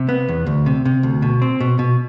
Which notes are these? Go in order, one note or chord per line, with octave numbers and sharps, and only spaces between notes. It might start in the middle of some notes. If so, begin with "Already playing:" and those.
Already playing: C3
B3
E2
D2
C3
C3
D2
B2
C4
B2
B2